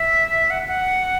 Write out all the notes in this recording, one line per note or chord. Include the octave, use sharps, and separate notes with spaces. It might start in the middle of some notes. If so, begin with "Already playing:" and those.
Already playing: E5
F#5
F#5